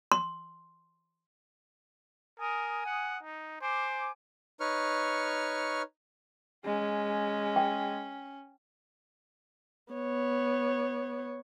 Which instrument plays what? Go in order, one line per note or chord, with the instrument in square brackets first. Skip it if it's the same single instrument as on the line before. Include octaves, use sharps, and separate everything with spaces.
[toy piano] C6
[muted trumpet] A#4 [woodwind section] G#5 D#6
[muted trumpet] F#5
D#4
[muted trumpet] C5 [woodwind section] G#5 D6
[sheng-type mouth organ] D#4 B4 C#5 C#6 F6
[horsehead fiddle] G#3 [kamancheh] C#4
[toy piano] G5
[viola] B3 C#5